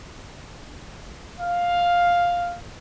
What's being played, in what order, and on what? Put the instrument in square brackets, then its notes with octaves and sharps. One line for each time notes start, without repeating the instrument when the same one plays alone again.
[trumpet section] F5